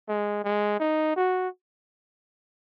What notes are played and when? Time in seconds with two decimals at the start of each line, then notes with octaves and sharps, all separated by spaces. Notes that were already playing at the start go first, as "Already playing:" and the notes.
0.08 G#3
0.44 G#3
0.80 D#4
1.16 F#4